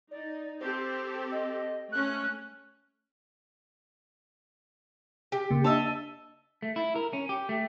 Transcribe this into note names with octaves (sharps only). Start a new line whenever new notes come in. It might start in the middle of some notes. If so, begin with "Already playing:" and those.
D#4 D5
C4 G4 A4 C5
D#5
A3 C#4 F#6
G4
C#3 A#3
D4 D#5 E5 A5
A3
E4
A#4
C#4
G4
A3